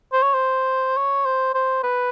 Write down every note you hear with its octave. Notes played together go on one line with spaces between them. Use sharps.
C5
C#5
C5
C#5
C5
C5
B4